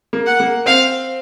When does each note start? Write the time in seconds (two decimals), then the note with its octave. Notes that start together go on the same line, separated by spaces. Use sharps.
0.13 A#3
0.26 F#5
0.40 A#3
0.66 C4 F5